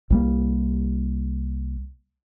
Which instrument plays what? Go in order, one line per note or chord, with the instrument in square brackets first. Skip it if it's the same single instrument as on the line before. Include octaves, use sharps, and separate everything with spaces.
[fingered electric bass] C2 G3 A#3